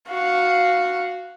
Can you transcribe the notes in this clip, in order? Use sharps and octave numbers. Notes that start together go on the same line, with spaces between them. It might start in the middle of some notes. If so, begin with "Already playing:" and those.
F#4 F5